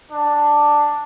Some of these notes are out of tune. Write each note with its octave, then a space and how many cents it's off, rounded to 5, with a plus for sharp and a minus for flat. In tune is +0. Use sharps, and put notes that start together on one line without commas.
D4 +5